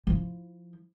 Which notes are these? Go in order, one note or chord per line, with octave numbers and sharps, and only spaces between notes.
F3 E4